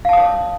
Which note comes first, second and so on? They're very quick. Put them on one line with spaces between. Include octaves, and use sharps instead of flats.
F5 A5 D#6 C#5